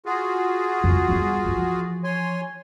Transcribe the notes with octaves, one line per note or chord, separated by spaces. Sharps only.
F4 F#4 G#4
F2
G3 B3
E3 F3
C#5 G#5 C6